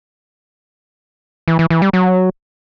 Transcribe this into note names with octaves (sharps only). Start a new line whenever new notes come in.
E3
E3
E3
G3
F#3